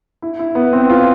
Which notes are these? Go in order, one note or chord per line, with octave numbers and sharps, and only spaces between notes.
E4
E4
B3
C4
F4